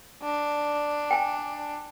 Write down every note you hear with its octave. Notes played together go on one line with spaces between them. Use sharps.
D4
G5 G#5